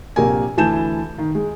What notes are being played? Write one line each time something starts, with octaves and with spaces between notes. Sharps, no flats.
A#1 C3 A#3 G4 A#4 G#5
D2 E3 G#5 A5 G6 E7
D#3
G#3